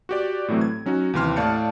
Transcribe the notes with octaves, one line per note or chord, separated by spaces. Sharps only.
F#4 G4 D5
A2 E3 F#3 A3 C4
G#6
F#3 C#4 D#4 F#4
D#2 C3 E3 C6 F6
A2 D5 F5 A5 G6 C#7